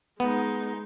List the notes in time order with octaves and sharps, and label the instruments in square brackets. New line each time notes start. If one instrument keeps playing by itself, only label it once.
[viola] G#3 D#4 [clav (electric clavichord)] B3